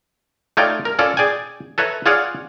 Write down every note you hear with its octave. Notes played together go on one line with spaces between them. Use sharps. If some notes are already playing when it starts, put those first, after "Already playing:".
A3 D#4 F4 C#5 D5 G5
A#4
C#4 F4 A4 D5
G#4 D5 G5 G#5
A4 B4 C#5 E5 A#5
F4 G#4 C#5 D5 F5 F#5